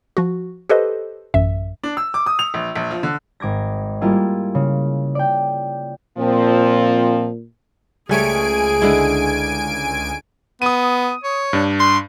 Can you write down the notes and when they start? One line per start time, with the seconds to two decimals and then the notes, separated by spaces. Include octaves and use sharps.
0.17 F3 F#4
0.69 G4 A4 B4 C5 D#5
1.34 A1 F#2 E5
1.84 D4
1.97 E6
2.14 D6
2.26 D#6
2.39 F7
2.54 A#1
2.75 A#1
2.91 F3
3.03 D3
3.40 G#1 D6 G#6 A#6
4.01 G3 A#3 E4 F4 G#4
4.55 C#3
5.15 D5 G5
6.18 A#2 F3 C4
8.09 C#2 G3 A3 G#4 C#5 G#5 D7
8.82 D3 G#3 E4
10.62 B3 D#6 D#7
11.24 C#5
11.53 G2 D4
11.80 C6